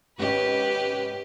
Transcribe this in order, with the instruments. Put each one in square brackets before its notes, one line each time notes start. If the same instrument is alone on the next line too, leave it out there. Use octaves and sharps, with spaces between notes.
[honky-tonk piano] G#1 C#4 D#5 [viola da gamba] G4 [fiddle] B4